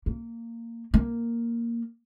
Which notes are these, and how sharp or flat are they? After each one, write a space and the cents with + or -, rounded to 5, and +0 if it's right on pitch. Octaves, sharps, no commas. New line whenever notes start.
A#3 -15
A#3 +0